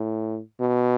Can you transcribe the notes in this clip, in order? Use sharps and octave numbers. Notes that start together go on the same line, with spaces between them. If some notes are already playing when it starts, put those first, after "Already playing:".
Already playing: A2
B2